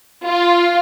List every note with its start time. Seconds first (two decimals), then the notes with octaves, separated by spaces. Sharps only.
0.25 F4